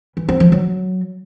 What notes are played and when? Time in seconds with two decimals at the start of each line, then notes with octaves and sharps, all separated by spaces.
0.17 E3
0.29 C4
0.40 F3
0.52 F#3